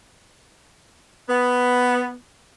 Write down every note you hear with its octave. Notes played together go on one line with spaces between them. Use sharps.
B3